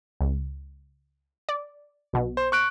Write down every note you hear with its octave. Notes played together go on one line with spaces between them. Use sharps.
C#2
D5
B1 B2
C5
C#6 F#6 D7